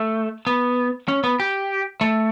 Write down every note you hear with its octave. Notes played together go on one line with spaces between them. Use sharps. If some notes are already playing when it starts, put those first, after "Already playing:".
Already playing: A3
B3
C#4
B3
G4
A3